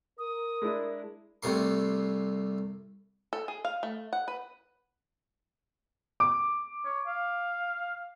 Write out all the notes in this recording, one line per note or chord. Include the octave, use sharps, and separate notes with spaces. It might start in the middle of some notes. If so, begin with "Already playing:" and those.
A#4 D#6
G#3 D4 E4
C2 C3 A3 C6
A4
G#4
F5
A3
F#5
B4
D6
C#5
F5